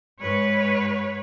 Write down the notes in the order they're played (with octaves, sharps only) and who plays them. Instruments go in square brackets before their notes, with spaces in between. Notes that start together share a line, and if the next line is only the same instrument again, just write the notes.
[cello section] G#2 B4 C#5